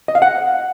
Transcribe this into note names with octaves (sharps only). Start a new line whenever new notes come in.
D#5
F5
F#5